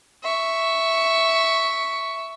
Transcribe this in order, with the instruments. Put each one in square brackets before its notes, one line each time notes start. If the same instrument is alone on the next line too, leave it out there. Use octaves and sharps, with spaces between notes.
[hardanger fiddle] E5 C#6